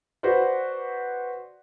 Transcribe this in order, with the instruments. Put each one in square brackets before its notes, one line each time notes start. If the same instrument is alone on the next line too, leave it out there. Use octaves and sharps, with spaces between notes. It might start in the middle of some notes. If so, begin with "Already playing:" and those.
[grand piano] F#4 B4 C5 D5